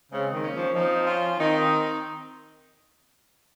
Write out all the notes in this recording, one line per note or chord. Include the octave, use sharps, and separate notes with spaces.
C#3 G#3 C4
D#3
A#3 C#4
F3
F3 C4 D#4
C#4 F4
D#3 C4 D#4